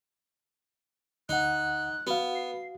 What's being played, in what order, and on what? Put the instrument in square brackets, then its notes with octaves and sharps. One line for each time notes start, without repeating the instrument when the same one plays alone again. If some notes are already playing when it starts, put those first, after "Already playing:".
[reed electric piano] D2 F#5 [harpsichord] D#4 [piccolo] F#6
[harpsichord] B3 [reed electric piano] F#4 F5
[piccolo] C7